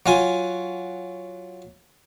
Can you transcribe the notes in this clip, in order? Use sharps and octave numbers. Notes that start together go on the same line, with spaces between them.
F#3 F4 G#5